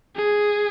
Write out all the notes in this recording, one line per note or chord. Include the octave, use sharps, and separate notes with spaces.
G#4